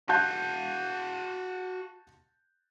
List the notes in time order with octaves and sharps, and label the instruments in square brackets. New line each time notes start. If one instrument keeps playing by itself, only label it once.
[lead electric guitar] F#4 F5 [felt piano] A5 F#6 G6